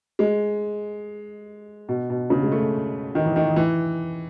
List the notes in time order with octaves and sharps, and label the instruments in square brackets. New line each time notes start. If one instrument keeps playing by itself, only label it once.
[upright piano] G#3
B2
B2
C#3
G#3
A3
D#3
E3
D#3
E3